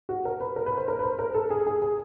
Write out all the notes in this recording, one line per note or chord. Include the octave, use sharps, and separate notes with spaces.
F#4
A#4
B4
A#4
B4
C5
A#4
B4
C5
A#4
A4
G#4
G#4
G#4